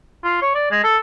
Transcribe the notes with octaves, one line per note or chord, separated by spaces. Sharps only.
F4
C#5
D5
G#3
A4